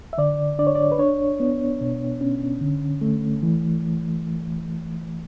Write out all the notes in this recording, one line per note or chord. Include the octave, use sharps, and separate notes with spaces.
E5
D3 D5
D4 D5
C#5
D5
B4
D4 C#5
B3
B2
C#4
D3
A3
E3